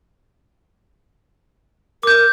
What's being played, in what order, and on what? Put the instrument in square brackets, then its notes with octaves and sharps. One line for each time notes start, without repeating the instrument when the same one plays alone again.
[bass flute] A#4 [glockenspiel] D6 G6